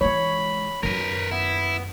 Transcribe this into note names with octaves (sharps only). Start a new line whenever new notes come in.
E3 G#3 C#5 B5
F#2 D#3 A#4 B4
B3 E4